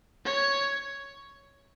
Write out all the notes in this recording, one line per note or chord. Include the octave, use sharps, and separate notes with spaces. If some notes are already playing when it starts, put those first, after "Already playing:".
C#5